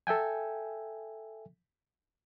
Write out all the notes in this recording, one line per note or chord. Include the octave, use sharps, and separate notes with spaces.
A4 E5 G5 G#5